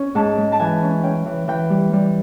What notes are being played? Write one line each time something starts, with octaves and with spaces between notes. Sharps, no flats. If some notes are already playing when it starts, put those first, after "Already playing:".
Already playing: C#4
G#2 A5
G#3
A5
E3 G#5
C#4
C#4 G5
E3
E3 G5
G3
G3